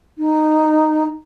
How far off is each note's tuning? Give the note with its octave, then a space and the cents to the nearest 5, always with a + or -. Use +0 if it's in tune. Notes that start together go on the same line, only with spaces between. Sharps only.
D#4 -10